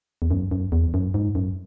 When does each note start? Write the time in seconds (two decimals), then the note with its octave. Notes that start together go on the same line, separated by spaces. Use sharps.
0.22 E2
0.31 F#2
0.51 F#2
0.72 E2
0.94 F#2
1.14 G#2
1.35 F#2